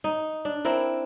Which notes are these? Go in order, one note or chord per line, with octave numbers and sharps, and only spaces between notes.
D#4
D4
C4 E4 A#4